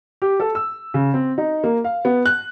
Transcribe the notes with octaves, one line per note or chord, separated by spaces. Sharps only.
G4
A4
E6
C#3
C4
D#4
A#3
F5
B3
F#6